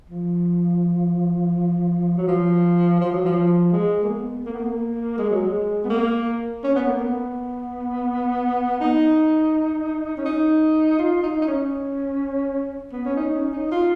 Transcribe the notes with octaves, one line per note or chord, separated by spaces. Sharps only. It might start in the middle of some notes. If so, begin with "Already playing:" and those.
F3
F#3
F3
F3
F#3
F3
G#3
A#3
B3
A#3
B3
A#3
G#3
F#3
G#3
B3
A#3
C#4
B3
A#3
B3
D#4
C#4
D#4
F4
D#4
D#4
C#4
B3
C#4
D#4
C#4
D#4
F4